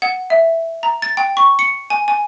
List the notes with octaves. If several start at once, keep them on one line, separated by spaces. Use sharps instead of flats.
F#5
E5
A#5
A6
G5
C#6
C#7
G#5
G#5